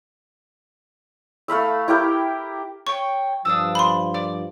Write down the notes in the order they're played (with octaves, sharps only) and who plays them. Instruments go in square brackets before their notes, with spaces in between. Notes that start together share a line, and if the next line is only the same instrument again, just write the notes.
[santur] A3 F5 B5 E6
E4 G4 A#4 G5
[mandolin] C#5 G5 [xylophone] C#6
[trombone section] G2 F3 [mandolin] D4 D#6 E6
[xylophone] B5 C6
[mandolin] D5